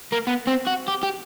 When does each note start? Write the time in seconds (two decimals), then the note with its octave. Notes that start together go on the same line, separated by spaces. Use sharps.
0.12 A#3
0.27 B3
0.47 C4
0.67 F#4
0.88 G4
1.03 G4